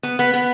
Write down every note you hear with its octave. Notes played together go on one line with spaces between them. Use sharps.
B3
B3
B3